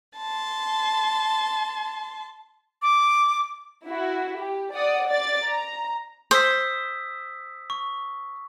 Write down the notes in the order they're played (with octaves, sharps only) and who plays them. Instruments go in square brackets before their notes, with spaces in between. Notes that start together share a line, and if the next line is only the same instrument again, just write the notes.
[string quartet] A5 C6
[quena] D6
[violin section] E4 F#4
G4
D5 F#5 D#6
D5 A6
A#5
[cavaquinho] C5 [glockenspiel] D#6 E6 B6
[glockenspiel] C#6